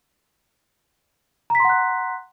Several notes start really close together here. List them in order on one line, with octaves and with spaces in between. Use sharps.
A#5 B6 C6 F#5 F#6